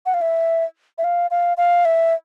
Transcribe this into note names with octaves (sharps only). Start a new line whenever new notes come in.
F#5
F5
E5
E5
F5
F5
F5
E5